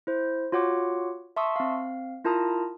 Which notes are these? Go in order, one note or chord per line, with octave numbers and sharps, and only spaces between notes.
E4 C5
F4 F#4 C#5 F#5 D6
E5 A5 C6 C#6 D#6 E6
C4 F5
E4 F4 A#4 A5 A#5 D#6